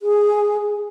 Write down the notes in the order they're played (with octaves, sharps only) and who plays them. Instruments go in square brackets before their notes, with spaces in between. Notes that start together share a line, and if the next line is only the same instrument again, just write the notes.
[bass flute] G#4